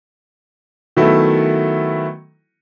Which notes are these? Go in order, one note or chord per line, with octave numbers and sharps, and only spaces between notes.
D#3 F#3 A3 B3 E4